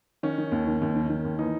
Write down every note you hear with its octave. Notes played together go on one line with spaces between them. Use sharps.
D#3 C#4
D#3
D#2
D#3
D#2
D#3
D#3
D#2
E3 D#4